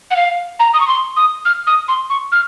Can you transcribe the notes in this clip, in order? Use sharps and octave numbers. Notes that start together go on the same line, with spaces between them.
F#5
F5
A#5
D#6
C#6
C6
D#6
F6
D#6
C6
C#6
F6